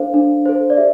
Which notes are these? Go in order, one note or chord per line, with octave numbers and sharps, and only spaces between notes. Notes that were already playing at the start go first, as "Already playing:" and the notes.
Already playing: D4 A4 C5 F5
D4
A4 C5
D5
G4 E5